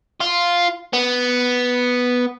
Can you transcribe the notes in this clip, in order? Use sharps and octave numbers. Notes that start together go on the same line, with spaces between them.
F4
B3